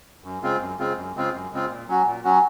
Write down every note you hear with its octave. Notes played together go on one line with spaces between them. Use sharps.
F#2
C#3 G#3 C4 F4
F#2
C#3 G#3 C4 F4
F#2
C#3 G#3 C4 F4
F#2
C#3 G#3 C4 F4
A#2
F#3 C#4 F#4
A#2
F#3 C#4 F#4